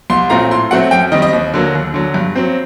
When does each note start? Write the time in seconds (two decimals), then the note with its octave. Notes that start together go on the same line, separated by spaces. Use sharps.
0.10 C2 C6
0.30 A#2 F#3 A3 C4 A#5
0.51 A2 C6
0.71 F#3 A3 C4 F#5
0.91 F#2 G5
1.12 D#3 G3 C4 D#5
1.22 D#5
1.33 D#2
1.54 D3 F#3 A#3
1.74 D#2
1.94 D3 F#3
2.14 G2
2.35 F#3 C4